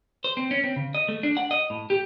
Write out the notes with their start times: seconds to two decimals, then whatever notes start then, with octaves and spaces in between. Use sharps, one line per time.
0.24 C5
0.37 C4
0.51 C#4
0.64 C4
0.76 C#3
0.95 D#5
1.09 A3
1.23 D4
1.37 F#5
1.51 D#5
1.70 A2
1.90 G4